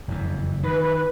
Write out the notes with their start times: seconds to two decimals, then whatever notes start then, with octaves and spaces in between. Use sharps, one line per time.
0.08 F#1 F2 E3
0.63 D#3 B4